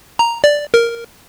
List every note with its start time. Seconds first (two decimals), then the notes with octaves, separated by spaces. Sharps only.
0.19 A#5
0.44 D5
0.74 A#4